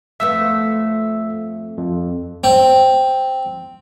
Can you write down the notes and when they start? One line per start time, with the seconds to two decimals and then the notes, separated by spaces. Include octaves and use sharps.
0.20 F2 A3 B3 E5 E6
1.78 F2
2.44 C4